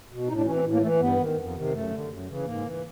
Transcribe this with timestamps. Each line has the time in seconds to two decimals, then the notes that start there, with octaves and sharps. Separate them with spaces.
0.10 B2
0.28 A2 D#4
0.37 D4
0.46 E3 C#4
0.55 C4
0.64 A2
0.73 A#3
0.82 E3 A3
1.00 G2 B3
1.19 D#3
1.37 F2
1.55 C3 D#3
1.73 F#2 A3
1.91 D3
2.10 F#2
2.27 C#3 E3
2.46 G#2 A#3
2.64 E3